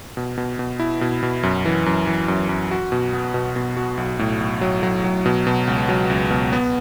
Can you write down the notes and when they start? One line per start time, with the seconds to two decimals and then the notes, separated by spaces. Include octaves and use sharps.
0.17 B2
0.38 B2
0.59 B2
0.80 E4
1.01 B2
1.23 B2
1.43 F#2
1.65 E3
1.86 F#2
2.07 E3
2.28 F#2
2.49 F#2
2.71 F#4
2.92 B2
3.13 B3
3.34 B2
3.56 B2
3.77 F#4
3.97 B1
4.19 A2
4.40 B1
4.61 F#3
4.83 F#3
5.04 F#3
5.26 B2
5.47 B2
5.67 C#2
5.89 F#3
6.10 C#2
6.30 B2
6.53 B3